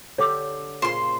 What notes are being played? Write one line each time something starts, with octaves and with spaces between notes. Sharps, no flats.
D3 G4 C#5 D6 E6
A#2 C#3 C5 F5 C6